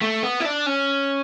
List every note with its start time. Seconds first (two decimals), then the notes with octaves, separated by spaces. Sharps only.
0.01 A3
0.23 B3
0.40 E4
0.45 D4
0.66 C#4